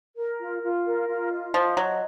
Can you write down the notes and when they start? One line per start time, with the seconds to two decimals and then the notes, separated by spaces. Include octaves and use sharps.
0.17 A#4
0.40 F4
0.62 F4
0.86 A#4
1.08 F4
1.32 D#5
1.54 F3 D#5
1.77 F#3 D#5